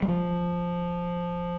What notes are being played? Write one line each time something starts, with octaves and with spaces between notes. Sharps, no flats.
G3
F3